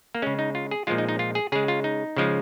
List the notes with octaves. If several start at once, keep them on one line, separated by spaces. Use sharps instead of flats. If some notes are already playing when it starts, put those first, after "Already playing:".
A#3
C#3 G#3 C#4
D#4
F4
G#4
A#2 F3 G#3 F4
D#4
D#4
F4
G#4
C#3 G#3 G#4
F4
D#4
C#3 F3 G#3